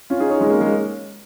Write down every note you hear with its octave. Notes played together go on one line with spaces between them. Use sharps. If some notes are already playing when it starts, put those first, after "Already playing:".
C#4 F4
D#4 G#4
G#4 C#5
G#3 C#4
A#3
G#3